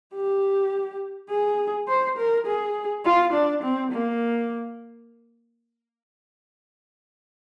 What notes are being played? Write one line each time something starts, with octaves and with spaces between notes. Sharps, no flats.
G4
G#4
C5
A#4
G#4
F4
D4
C4
A#3